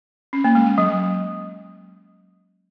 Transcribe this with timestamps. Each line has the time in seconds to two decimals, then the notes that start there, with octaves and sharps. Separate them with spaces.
0.33 C#4
0.44 A#3
0.55 G#3
0.66 G#3
0.78 F#3